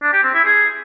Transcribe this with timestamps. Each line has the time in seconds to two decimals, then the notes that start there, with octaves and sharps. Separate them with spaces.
0.03 D4
0.13 G4
0.23 C4
0.34 E4
0.44 G#4